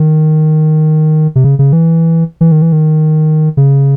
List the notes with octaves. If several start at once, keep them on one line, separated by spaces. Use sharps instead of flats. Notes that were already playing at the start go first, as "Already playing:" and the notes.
Already playing: D#3
C3
C#3
C#3
E3
E3
D#3
E3
D#3
C#3